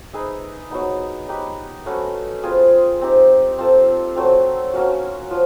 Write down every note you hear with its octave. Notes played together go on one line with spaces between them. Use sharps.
D#4 G#4 B4 E5
F#3 B3 D#4
D#4 G4 B4
A3 C#4 F#4 B4
C4 F4 G#4
C4 D#4 G4
C4 F4 A4
F#3 A3 C4
F#3 A#3 C#4 F#4
F3